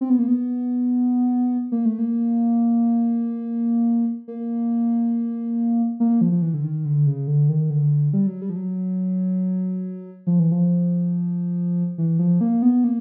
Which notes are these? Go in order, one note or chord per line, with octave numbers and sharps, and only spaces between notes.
C4
B3
A#3
B3
A#3
A3
A#3
A#3
A#3
F3
F3
E3
D3
D#3
D3
C#3
D3
D#3
D3
G3
F#3
G3
F3
F#3
F3
E3
F3
E3
F3
A#3
B3
A#3